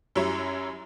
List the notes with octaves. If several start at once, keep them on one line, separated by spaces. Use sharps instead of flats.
F#2 F#3 G3 E4 C#5 A#5